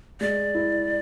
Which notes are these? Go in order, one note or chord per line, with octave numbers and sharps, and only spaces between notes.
G#3 D5
E4